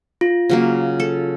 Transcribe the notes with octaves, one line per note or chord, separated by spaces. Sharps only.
F4
C#3 F#3 A#3
A4